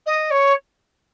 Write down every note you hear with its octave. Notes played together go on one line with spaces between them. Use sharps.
D#5
C#5